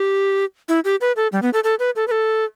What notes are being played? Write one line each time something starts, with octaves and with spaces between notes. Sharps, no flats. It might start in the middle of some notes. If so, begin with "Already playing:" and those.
Already playing: G4
E4
G4
B4
A4
G3
B3
A4
A4
B4
A4
B4
A4